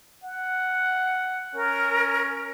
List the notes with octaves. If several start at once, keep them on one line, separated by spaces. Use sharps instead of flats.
F#5
C#4 A#4